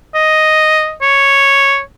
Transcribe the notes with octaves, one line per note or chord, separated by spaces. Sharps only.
D#5
C#5